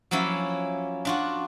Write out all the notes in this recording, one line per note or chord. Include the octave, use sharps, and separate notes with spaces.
F3 F#3 A#3 C#4 E4
D4 F4 F#4